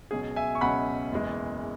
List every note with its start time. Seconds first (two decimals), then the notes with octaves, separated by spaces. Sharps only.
0.11 C#2 B2 F#3 C#4 G#4
0.36 E5 G#5
0.55 C#6
0.61 C#2 B2 F#3 C#4 F#5 B5
1.12 F#1 E2 E3 G#3